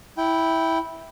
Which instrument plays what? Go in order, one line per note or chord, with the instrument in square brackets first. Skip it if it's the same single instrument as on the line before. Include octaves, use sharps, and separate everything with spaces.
[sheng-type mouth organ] E4 G5